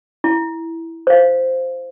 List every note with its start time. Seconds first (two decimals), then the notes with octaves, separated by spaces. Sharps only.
0.24 E4
1.07 C5 F5